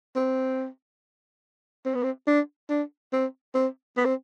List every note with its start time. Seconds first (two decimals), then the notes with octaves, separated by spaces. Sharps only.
0.16 C4
1.85 C4
1.95 B3
2.03 C4
2.27 D4
2.70 D4
3.13 C4
3.54 C4
3.97 B3
4.05 C4